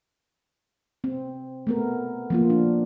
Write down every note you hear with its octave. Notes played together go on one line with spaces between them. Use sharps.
C4
A3 B3 A#4
F3 A#3 F4
D4